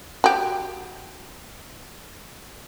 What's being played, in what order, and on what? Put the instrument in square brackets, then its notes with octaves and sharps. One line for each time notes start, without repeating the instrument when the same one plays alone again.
[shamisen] F#4 G4